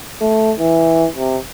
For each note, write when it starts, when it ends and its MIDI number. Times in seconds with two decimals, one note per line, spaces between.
0.21 0.52 57
0.59 1.08 52
1.15 1.37 48